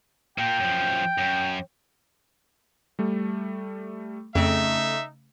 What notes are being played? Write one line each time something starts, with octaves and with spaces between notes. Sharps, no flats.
A#2 A#3 G5
F#2 F3
F#2
G3 A3
F2 C#3 A3 C4 D#4 E5